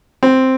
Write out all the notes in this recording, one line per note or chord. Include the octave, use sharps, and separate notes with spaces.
C4